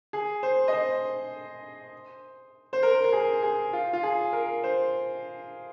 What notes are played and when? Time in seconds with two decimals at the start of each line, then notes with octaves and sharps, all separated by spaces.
0.13 G#4
0.43 C5
0.68 D#5
0.73 C5
2.73 C5
2.83 A#4
3.04 A#4
3.13 G#4
3.43 G#4
3.73 F4
3.93 F4
4.03 G#4
4.33 A#4
4.64 C5